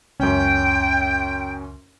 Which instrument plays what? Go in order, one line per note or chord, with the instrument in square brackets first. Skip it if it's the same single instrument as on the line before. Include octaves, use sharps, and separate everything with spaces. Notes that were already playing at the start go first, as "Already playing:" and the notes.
[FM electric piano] C#2 [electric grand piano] F#2 C#4 [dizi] G5